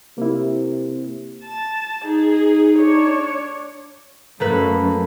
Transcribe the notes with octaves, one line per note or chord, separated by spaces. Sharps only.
C3 A#3 E4
A5
D#4 G#4
D4 C#5
F#2 A3 A#3 B4